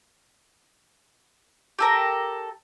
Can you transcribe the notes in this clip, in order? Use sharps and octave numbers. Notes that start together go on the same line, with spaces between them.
G4 A4 A#4